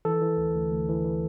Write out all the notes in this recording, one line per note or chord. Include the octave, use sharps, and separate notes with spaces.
E3 A4
E3
D2
D2
D2
E3
E3